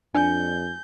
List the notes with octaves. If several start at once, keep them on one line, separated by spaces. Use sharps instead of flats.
F2 D4 G#5 G6